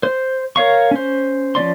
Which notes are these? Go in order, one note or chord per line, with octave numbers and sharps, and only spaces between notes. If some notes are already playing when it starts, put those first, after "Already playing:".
C5
A#4 C#5 F5 C#6
C#4 C5
F3 C#4 D5 C6